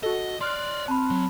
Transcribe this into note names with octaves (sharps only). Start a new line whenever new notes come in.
F#4 A4 D#5
C#5 D5 C6 F6 F#6
C4 A5 B5
F#3